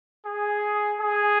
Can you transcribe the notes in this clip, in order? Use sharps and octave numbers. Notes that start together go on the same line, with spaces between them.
G#4
G#4